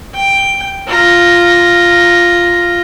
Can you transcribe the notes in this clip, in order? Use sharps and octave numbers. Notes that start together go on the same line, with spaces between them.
G5
F4 A#5